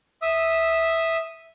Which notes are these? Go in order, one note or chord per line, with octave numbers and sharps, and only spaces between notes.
E5 D#6 E6